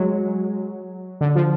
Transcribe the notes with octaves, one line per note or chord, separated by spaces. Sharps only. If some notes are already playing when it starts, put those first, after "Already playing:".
Already playing: F#3 G#3
D3
F3